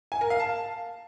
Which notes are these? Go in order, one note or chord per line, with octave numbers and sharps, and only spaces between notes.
G#5
A#4
F5
A5